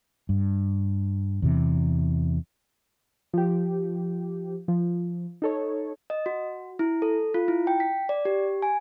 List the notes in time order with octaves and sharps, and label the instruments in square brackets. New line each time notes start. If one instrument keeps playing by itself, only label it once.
[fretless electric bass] G2
E2 C3 E3
[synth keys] F3 G4
F3
D#4 A4 C#5
[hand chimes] D#5
F#4
E4
A4
F4
E4
G5
B6
D5
G4
G#5